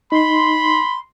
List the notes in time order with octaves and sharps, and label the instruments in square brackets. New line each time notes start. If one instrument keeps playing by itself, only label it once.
[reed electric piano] D#4 [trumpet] B5 [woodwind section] C6